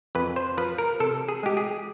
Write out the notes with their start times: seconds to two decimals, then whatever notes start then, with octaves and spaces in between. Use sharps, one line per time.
0.15 F2 B4
0.36 C5
0.57 F3 B4
0.78 A#4
1.00 C3 A4
1.29 G#4
1.43 G#3 G4
1.57 G#4